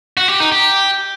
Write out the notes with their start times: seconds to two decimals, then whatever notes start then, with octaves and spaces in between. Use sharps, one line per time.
0.17 F#4
0.29 G4
0.40 D#4
0.52 G4